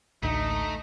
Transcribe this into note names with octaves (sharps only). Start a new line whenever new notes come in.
A1 D2 A3 D#4